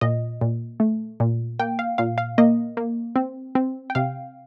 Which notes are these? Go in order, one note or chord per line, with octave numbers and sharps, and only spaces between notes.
A#2 D#5
A#2
A3
A#2
A#3 G5
F5
A#2 F5
F5
A#3 D#5
A#3
C4
C4
G5
C3 F5